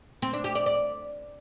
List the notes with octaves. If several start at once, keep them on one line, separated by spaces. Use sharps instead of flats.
C4
D4
G4
D5
D5